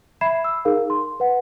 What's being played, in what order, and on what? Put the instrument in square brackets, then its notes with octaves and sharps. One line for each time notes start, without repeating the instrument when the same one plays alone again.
[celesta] E5 B5 G#6 C7 E7
E6
D#4 G#4 A#4 F5
C6
B4 F#5